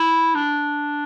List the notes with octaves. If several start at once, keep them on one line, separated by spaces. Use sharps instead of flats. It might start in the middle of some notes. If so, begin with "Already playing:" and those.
Already playing: E4
D4